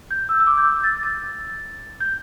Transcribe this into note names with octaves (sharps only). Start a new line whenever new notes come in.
G6
E6
E6
D6
G6
E6
A6
A6
G6